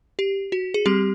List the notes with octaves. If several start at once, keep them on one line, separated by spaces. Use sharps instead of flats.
G4
F#4
G#4
G3 C4 G4